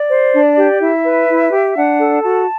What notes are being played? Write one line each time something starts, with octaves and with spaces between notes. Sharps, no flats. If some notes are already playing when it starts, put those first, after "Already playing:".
Already playing: D5
C5
D4
G4
E4 E5
B4
E4
G4
D4 F#5
A4
F#4 A5